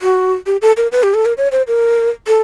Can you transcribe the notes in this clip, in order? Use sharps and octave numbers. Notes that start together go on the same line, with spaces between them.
F#4
G4
A4
A#4
B4
G4
A4
A#4
C#5
C5
A#4
A4